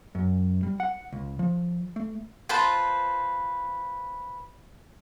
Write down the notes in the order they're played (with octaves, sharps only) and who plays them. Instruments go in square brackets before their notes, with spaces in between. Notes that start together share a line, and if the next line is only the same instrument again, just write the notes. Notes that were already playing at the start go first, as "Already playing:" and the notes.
[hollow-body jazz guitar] F#2
G3
F#5
C#2
F3
A3
[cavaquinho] F4 B4 C5 A5